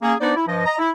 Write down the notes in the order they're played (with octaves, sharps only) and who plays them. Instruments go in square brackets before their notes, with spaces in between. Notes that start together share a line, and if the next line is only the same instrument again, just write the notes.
[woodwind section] A#3 C#4 G#4
B3 D4 D#4 B4 C5 D5
E4
G2 F3 D#5
D#5 A#5
E4